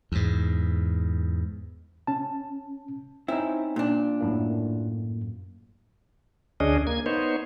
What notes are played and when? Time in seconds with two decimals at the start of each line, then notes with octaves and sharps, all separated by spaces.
0.12 E2 G#2
2.07 C#4 A5
3.28 C4 C#4 D#4 E4
3.76 A#2 D4
4.20 F#2 A2 A#3
6.60 D2 C#4 D4 G#4 D#5
6.87 A#3 G#6
7.06 B3 D#4 C5 C#5